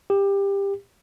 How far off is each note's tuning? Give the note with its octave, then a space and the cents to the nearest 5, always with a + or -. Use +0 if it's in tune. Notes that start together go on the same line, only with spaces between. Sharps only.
G4 +20